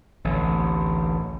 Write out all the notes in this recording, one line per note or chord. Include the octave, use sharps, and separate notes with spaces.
A1 D2 D3